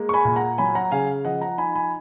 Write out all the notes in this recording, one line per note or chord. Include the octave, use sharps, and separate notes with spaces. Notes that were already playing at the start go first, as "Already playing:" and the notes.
Already playing: G#3 A#3
C#6
G#5 B5
A#2
F#5 A#5
F#3 G#5 B5
F#5 A#5
C#3 F5 G#5
F3 D#5 F#5
F#5 A#5
D#4 G#5 B5
G#5 B5